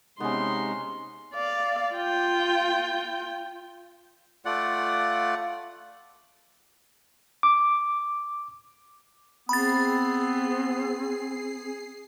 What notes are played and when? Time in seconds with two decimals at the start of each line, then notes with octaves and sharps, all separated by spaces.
0.20 C3 G#3 B3 C#4 D#4 C6
1.33 D5 F5
1.95 F4 G5
4.45 A3 F4 D5 F#5
7.43 D6
9.49 B3 C4 G#4 B5 A6 C7